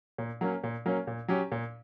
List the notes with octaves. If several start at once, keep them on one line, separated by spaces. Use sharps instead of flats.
A#2
F#3 A#3 C#4
A#2
F#3 A#3 C#4
A#2
F#3 C#4 G4
A#2